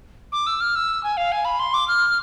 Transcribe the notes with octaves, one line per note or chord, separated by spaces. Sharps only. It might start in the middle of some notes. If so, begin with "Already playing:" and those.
D6
E6
F6
E6
G#5
F5
G#5
B5
C6
D6
F6